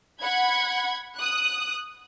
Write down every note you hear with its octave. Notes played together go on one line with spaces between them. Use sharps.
F#5 B5 G#6
D#6 F#6